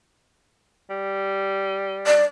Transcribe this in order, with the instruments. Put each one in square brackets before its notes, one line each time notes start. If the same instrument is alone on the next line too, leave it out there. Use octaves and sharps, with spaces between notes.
[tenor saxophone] G3
[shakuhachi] D5